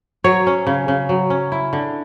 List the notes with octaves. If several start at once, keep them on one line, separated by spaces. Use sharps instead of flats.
F#3 C#5
C#4
C#3
C#3
F#3
C#4
E4
D3